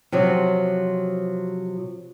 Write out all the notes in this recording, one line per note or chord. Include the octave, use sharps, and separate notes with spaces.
C3 F3 F#3